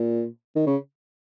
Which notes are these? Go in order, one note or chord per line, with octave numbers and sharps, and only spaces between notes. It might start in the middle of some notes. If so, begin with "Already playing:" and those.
Already playing: A#2
D#3
C#3